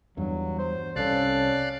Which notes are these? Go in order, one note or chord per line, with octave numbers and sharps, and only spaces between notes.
E2 G2 F#3
C5
C2 C#4 A4 D5 F5 F#6